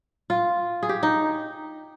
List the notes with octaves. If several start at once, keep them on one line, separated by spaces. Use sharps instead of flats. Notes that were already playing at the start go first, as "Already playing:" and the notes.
F4
G#4
G4
D#4